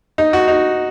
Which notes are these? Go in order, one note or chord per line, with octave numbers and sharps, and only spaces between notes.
D#4
F#4
D#4